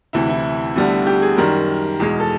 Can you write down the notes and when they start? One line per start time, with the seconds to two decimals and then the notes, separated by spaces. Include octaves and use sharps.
0.13 D2 C3 E3 E4
0.29 E4
0.76 D2 D3 G3 B3
1.07 G4
1.22 G#4
1.37 F#2 D#3 G3 A#4
2.00 E2 B2 G#3
2.20 A4